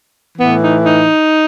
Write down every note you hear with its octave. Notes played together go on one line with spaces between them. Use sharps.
A2 E3 B3
D#4
D#4